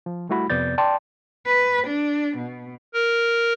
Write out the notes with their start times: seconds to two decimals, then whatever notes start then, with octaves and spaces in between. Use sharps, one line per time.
0.06 F3
0.29 G3 A3 E4 F#4 B5
0.50 F2 C3 B3 D5 G6 A6
0.78 D5 G5 A5 C6
1.47 B4
1.86 D4
2.37 B2
2.94 A#4